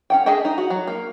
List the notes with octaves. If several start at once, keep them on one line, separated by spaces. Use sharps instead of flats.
C#4 F#5 G5
D4 G#4 D#5 E5 G5
D#4
F#4
F#3
A#3